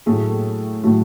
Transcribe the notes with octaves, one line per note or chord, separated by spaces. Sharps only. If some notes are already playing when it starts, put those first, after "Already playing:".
A2 F#3 A3 G#4
A2 F#3 A3